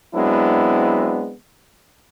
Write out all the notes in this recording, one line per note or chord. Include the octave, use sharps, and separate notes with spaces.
F#3 G#3 B3 C4 D4 E4